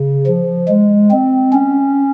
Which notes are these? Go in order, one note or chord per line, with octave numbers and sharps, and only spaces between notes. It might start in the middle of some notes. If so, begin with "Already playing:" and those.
Already playing: C#3
F3
G#3
C4
C#4